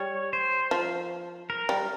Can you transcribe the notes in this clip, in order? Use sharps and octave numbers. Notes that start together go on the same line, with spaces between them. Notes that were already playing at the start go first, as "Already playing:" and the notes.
Already playing: G3 C#5
C5
F3
A#4
G3